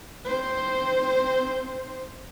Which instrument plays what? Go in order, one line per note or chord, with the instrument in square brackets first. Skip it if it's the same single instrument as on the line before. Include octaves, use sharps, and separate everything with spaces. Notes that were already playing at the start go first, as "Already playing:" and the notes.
[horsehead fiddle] C4 C5